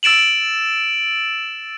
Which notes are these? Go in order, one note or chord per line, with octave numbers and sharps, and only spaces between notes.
E6 A6 D7 E7 F#7